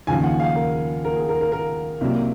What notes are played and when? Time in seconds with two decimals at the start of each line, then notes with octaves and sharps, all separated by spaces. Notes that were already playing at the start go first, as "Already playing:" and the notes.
0.07 D#2 C#3 F3 G#5
0.24 F#5
0.40 F5
0.55 A#4
1.05 A#4
1.16 G#4
1.29 A#4
1.41 A#4
1.52 A#4
2.01 C2 C3 F#3 A#3